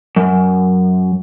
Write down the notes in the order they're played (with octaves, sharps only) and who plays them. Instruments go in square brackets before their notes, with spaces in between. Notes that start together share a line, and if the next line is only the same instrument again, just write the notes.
[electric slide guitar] F#2